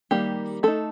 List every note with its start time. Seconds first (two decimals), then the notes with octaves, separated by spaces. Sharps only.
0.11 D#3 G3 A#3 G4
0.63 A3 D#4 A4